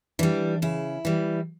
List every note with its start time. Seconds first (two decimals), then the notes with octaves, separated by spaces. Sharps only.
0.19 E3 G3 D4
0.62 C#3 E4
1.05 E3 G3